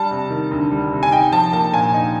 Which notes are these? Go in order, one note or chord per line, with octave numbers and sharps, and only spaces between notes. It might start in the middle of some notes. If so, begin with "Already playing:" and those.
Already playing: G3 A5
C3
D#3
D2
G3
C3
G#5
D#4 G5
F3 A5
A#3 A5
A#2 G#5
D#4